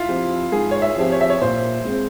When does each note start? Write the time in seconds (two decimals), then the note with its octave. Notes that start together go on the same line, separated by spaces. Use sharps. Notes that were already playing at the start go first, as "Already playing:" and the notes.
Already playing: E4 F4
0.08 F3 C4 G4
0.52 G#2 G#4
0.71 C#5
0.82 E5
0.97 F3 C4 G4
1.12 C#5
1.21 E5
1.30 C#5
1.41 A#2 C5
1.85 G#3 C4